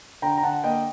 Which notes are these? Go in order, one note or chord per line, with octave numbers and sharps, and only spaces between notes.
D3 G5 A#5
A#5
D3 F#5 A5
A#3 D#5 G5